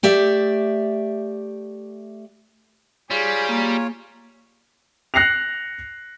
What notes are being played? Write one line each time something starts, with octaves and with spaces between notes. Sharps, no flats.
A3 G4 D5 E5
G3 F4 G#4 C#5
A#3
F#6 A#6 C7 C#7 F7